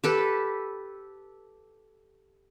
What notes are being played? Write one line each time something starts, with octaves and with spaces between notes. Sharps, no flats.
G4 A4 B4